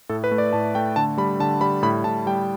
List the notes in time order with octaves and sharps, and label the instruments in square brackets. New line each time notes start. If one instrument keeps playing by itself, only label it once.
[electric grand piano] A2 A4
B4
A3
D5
A2 A5
A3 G5
D3 A5
G3 B5
D3 A5
G3 B5
A2 B5
A2 A5
G3 G5